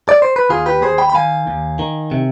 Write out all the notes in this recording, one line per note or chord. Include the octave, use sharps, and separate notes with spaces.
D5
C5
B4
D#2 F4 G#4
G4 B4
D#2 G#4 C5
G5 B5
B5
D#3 F5 G#5
D#2
D#3
C3